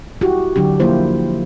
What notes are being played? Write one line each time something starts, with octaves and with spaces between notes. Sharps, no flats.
E4 F#4 G4
D3 F#3 D4 G4
F3 A#3 E4 F4 C5